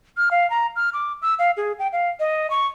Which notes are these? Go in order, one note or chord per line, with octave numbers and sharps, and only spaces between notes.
F6
F5
A#5
F6
D6
E6
F5
G#4
G5
F5
D#5
C#6